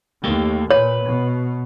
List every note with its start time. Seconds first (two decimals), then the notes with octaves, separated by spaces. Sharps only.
0.24 D#2 A3 A#3 G4
0.71 A#2 B4 C#5
1.06 B2